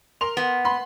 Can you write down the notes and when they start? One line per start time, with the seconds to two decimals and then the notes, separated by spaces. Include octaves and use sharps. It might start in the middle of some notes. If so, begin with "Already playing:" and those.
0.21 A#4 C6 F7
0.37 B3
0.65 B5 C6